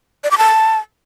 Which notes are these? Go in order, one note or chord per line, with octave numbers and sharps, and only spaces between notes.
D5
D6
A5